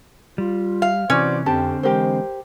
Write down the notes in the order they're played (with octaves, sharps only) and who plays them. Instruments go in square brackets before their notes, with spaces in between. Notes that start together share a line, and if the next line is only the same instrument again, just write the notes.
[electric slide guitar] G3 [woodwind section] F4
[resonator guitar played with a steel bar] F5
[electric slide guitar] C3 E3 [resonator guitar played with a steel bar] C#4 [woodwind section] F#4 C5 D5 [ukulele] B4
[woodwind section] F2 [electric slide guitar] D3 C4 [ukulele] G4 A5
[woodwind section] E3 G#3 [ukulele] G4 A#4 C5